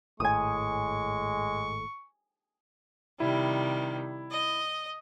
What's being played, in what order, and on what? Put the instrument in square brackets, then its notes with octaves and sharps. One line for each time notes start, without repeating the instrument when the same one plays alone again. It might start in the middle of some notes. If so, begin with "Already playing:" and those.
[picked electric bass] G#1 A2 [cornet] G#3 [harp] G#5 D#6 [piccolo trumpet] C#6
[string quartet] C3 D#3 G3 [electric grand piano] E4
[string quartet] D#5